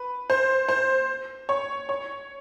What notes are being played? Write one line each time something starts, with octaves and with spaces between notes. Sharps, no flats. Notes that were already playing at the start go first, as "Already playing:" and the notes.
Already playing: B4
C5
C5
C#5
C#5